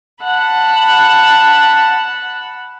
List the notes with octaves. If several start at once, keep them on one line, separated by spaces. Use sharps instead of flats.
F#5 A5 B5